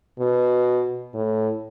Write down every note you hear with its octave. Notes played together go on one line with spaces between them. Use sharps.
B2
A2